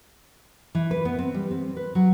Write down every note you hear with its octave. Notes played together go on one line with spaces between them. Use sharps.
E3
B4
B3
C4
G3
C4
B4
F#3